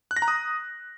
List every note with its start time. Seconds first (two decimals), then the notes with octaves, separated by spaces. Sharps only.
0.11 F#6
0.17 A#6
0.22 A#5
0.28 D#6